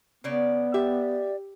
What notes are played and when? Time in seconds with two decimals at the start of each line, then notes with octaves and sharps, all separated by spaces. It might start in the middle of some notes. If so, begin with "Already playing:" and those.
0.24 C#3 B3 C#5 D5
0.74 G4 D5 E5